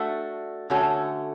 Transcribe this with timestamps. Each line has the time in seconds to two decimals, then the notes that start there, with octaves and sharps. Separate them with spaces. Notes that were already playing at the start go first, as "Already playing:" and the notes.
Already playing: A3 D4 F#4
0.70 D3 A3 C#4 F#4 A4